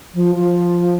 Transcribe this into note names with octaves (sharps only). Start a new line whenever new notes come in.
F3
F3